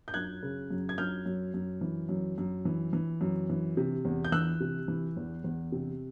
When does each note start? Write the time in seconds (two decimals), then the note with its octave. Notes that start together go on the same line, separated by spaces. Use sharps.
0.08 G6
0.14 F#2 F#6 G#6
0.43 C#3
0.70 F#2
0.89 G#6
0.98 F#2 F6 G6
1.26 F#2
1.54 F#2
1.81 E3
2.09 F#2
2.38 F#2
2.65 E3
2.93 E3
3.21 F#2
3.49 E3
3.77 C3
4.05 E2
4.25 G6
4.32 E3 E6 F#6
4.60 C3
4.88 E3
5.17 E2
5.44 E2
5.72 C3